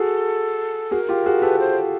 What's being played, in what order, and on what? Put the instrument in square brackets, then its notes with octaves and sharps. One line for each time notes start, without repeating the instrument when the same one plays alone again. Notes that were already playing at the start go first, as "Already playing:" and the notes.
Already playing: [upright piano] F#4 G#4 [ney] A4
[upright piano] F#4 G#4 [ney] A#4
[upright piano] F4 G4
F#4 G#4
[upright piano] G4 A4 [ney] B4
[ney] C5